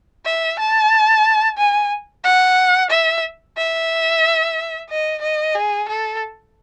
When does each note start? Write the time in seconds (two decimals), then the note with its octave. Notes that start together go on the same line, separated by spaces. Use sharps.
0.25 E5
0.59 A5
1.58 G#5
2.24 F#5
2.90 E5
3.57 E5
4.90 D#5
5.22 D#5
5.55 G#4
5.88 A4